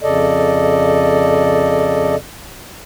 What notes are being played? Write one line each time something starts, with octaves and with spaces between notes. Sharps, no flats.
F2 C#3 A4 D5 D#5